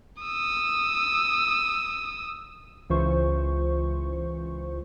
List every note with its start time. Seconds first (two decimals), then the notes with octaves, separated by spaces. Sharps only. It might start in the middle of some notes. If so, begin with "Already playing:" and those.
0.22 D#6 E6
2.89 C#2 E3 F4 C5 C#6